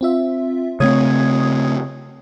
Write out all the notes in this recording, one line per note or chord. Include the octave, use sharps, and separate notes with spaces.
C4 F4 E5
C#3 A3 C4 C#5 D#6 G#6